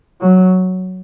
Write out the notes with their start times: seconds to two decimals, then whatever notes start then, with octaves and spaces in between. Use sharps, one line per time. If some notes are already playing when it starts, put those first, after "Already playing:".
0.21 F#3